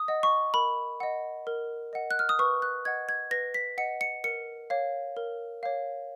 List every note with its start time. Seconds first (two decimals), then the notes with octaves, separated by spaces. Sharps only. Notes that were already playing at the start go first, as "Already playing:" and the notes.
Already playing: D#6
0.08 D#5 F#5
0.23 C#6
0.54 A#4 B5
1.00 D#5 F#5
1.47 A#4
1.93 D#5 F#5
2.11 F#6
2.19 F6
2.29 D#6
2.39 B4 C#6
2.62 F#6
2.85 D#5 F#5 G#6
3.09 G#6
3.31 B4 A#6
3.54 B6
3.78 D#5 F#5 C#7
4.01 C#7
4.24 A#4 C#7
4.70 C#5 F5
5.17 A#4
5.63 C#5 F5